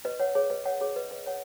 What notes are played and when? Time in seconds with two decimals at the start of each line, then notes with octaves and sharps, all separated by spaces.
0.05 B4 D#5
0.20 C#5 F#5
0.35 G#4 C#5
0.50 B4 D#5
0.66 C#5 F#5
0.80 G#4 C#5
0.96 B4 D#5
1.11 B4 D#5
1.26 C#5 F#5